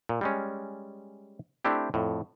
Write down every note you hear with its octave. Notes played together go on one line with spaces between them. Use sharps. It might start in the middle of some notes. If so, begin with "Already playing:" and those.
A#2
G3 G#3 C#4
A3 C4 D4 E4 G4
F2 A2